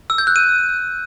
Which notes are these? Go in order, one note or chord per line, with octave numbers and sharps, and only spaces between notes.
E6
G6
F#6
D#7